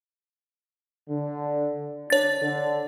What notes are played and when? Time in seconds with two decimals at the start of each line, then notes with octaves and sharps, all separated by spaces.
1.08 D3
2.10 D4 C#5 A6
2.41 D3